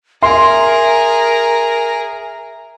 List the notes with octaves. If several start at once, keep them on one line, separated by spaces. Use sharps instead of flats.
G#4 A#4 E5 A#5 C6